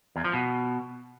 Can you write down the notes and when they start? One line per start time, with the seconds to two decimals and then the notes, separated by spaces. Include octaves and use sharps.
0.16 E2
0.24 F3
0.33 B2